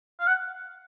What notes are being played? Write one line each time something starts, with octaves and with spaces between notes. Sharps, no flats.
F5
F#5